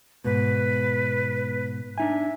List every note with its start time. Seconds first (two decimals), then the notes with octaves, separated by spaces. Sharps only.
0.24 G#2 B2 B4
1.98 D4 D#4 E5 G#5